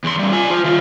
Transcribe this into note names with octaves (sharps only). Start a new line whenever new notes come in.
E2 C6
G3 C#4
F4 G#5
F4 C5
D#3 F4